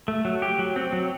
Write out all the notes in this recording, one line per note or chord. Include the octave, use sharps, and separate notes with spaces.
A3
F#3
G4
F#3
C4
F#3